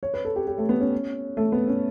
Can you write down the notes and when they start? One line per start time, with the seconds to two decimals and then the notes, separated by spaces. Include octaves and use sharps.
0.03 C#5
0.14 B4
0.25 A4
0.36 G4
0.47 G4
0.58 A3
0.69 B3
0.81 C#4
1.37 A3
1.52 B3
1.68 C#4